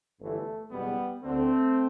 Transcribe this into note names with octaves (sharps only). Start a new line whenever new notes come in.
G1 G2 E3 A3
F#1 E2 B2 G3 B3
D2 D3 A3 C4